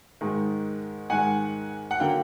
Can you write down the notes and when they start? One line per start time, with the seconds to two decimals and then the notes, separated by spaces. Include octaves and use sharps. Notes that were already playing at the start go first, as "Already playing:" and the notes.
0.21 G#2 D#3 G#3
1.10 G#2 D#3 G#3 F#5 G#5
1.91 F#5
2.00 D3 F#3 A#3 F5 G5